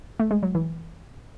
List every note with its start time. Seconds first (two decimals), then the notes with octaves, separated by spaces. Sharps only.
0.20 A3
0.31 G#3
0.43 F#3
0.55 E3